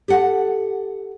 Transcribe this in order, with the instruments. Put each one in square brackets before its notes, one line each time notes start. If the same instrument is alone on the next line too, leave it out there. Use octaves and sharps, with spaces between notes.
[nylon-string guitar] G4 A4 F#5